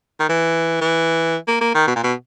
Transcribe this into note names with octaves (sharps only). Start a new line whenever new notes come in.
D#3
E3
E3
A#3
A#3
D#3
B2
A#2
B2